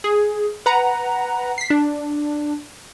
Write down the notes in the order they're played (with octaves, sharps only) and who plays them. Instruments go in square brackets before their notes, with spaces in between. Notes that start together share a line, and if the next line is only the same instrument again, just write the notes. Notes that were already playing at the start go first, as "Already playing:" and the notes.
[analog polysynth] G#4
B4 F#5 A#5
B6 C7
D4